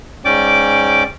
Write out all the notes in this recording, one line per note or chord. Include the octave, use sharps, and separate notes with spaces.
G#2 C#4 D5 G5 D6